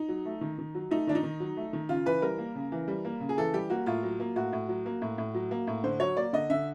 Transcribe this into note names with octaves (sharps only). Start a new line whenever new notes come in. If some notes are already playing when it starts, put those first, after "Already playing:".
Already playing: D#4
F#3
A3
D#3
D#3
F#3
A3 D#4
D#3 D4
D#4
D#3
F#3
A3
D#3
C#3 F4
E3 B4
G3 A#4
A#3
C#3
E3
G3
A#3
C#3
G#4
E3 A4
G3 G4
A#3 F#4
A2 F4
F#3
A#3
A2 F#4
A2
F#3
A#3
A2
A2
F#3
A#3
A2
D3 C5
F#3 C#5
A#3 D5
D3 D#5
D3 E5